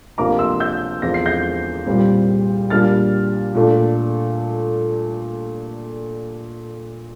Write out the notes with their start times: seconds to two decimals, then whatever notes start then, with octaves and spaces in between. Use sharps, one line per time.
0.18 D2 C3 F3 A#3 D4 A#5 D6
0.39 C6 E6
0.60 E6 G6
1.02 E2 D3 F3 C4 A#6
1.14 C7
1.26 G6 A#6
1.87 C2 A#2 G3 C4
2.70 A#2 G3 A#3 D4 F6 A6
3.55 A#2 A3 D4